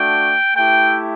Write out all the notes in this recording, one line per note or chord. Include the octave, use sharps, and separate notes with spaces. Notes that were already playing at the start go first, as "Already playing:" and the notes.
Already playing: A3 D4 F#4 G5
A3 E4 G4 G5